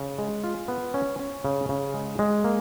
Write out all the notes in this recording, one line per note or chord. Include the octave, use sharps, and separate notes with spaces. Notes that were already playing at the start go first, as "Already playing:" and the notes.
Already playing: C#3
G#3
F4
B3
C#4
C#4
C#3
C#3
G#3
G#3
A#3